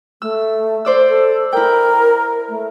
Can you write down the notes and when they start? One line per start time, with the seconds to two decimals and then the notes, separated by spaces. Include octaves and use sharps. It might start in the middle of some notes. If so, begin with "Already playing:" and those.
0.22 A3 E6
0.85 C5 D5 E6
1.09 A4
1.53 E4 A#4 G5
2.49 A3